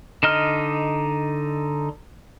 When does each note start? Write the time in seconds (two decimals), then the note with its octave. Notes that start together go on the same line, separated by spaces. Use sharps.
0.23 D3 D#4 D#5 F6